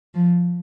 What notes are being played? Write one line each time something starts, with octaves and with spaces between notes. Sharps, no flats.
F3